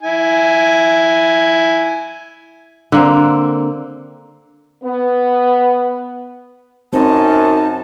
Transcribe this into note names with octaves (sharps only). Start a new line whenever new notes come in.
E4 G#5
D3 A#3 C4
B3
F#2 C4 D#4 C5 A5